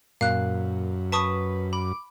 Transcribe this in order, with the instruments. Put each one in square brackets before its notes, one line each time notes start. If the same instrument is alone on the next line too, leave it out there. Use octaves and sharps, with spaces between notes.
[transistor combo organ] F#2 [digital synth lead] A#2 [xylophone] F5 F#6
[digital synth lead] B4 [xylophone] A5 C#6 D#6
[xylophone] B5 [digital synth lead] D6